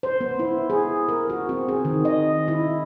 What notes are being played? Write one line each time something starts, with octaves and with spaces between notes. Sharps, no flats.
C5
B3
E4
G#4
A#4
F#4
C4
G#4
D#3
D#5
E4